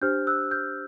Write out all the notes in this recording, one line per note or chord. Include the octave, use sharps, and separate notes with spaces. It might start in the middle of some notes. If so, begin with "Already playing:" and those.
D4 G4 C5 F6 G6
E6 F#6
F6 G6